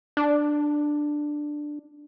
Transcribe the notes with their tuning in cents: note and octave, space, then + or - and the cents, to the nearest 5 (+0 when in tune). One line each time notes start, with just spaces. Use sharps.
D4 +10